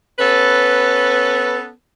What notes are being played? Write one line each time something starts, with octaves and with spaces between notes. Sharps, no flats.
B3 C#4 A4 B4